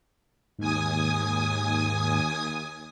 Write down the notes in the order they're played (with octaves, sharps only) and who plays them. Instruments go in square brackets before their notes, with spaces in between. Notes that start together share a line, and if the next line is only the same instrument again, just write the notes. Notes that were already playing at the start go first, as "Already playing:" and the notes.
[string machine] D#2 G#5 D#6 [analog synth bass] G#2